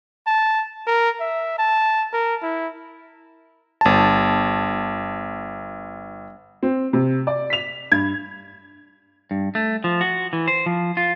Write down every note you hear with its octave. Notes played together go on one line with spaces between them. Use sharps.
A5
A#4
E5
A5
A#4
E4
G1 A5
C4
C3
D5
B6 F7
G2 G#6
G2
A3
F3
F#4
E3
C5
F3
F4